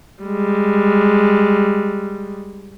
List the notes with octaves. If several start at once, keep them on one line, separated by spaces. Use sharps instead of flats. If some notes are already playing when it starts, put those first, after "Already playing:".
G3 G#3